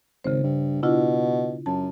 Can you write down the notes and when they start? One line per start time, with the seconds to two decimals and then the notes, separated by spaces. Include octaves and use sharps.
0.24 G#1 C#3 C5
0.43 G2
0.83 B2 D4 E4 F4
1.66 F#2 A5